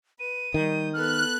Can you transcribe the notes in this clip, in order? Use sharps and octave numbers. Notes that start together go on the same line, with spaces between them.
B4 D#7
D#3 G3 D#6 G6
B3 A4 B4 F6 F#6